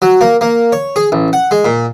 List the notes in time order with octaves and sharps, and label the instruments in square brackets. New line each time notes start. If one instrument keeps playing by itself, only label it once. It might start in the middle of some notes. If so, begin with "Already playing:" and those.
[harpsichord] F#3
A#3
A#3
C#5
G#4
A1
F#5
G#3
A#2